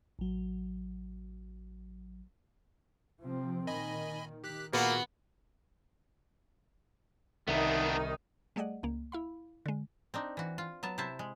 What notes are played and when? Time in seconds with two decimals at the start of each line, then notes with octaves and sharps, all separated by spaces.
0.19 A1 F#3
3.23 C3 F3 C4
3.67 A#2 D#3 D#5 G#5 B5
4.44 D#3 G4 F#6 B6
4.73 A#2 A#3 B3 F#4 G#4
7.48 C2 D#3 B3 D4 D#4
8.56 G3 A3 G#4 D5 D#5 F#5
8.83 C#2 A#3
9.12 E4 F5 B5
9.66 D3 G#3
10.14 C4 D4 D#4
10.37 E3 F#4
10.58 F4
10.83 F#3 B3 A5
10.98 C3 E4 C5 E5 A5
11.19 G#3